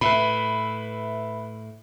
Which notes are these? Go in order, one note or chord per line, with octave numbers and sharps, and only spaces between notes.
A2 B4 E5 B5